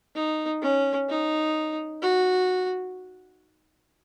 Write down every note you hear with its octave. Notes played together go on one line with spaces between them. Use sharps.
D#4
C#4
D#4
F#4